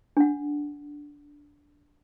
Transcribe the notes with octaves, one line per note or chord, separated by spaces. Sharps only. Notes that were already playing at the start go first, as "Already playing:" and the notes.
D4 F#5